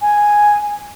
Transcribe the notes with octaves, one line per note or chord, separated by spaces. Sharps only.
G#5